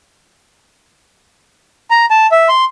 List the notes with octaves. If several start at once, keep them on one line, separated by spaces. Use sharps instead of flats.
A#5
A5
E5
C6